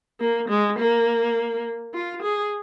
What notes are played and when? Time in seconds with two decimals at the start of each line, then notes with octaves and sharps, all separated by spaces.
0.20 A#3
0.49 G#3
0.78 A#3
1.94 F4
2.22 G#4